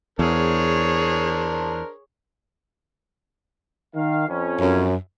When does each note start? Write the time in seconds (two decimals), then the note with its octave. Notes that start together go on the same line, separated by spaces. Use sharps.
0.19 E2 D4 G#4 A#4 C5 C#5
3.95 D#3 F5
4.28 F2 C#4
4.60 F#2